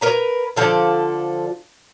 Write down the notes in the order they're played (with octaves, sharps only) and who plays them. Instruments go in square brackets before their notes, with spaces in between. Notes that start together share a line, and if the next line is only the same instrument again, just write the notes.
[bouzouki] A#4 B4 A#5
D3 F3 A4 D5